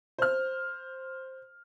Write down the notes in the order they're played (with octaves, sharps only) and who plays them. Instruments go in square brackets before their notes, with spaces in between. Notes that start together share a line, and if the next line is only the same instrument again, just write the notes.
[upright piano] C5 F6